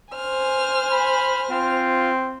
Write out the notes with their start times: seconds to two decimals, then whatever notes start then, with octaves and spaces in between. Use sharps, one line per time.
0.15 C5 G#5 F6
0.92 B5
1.50 C4 F4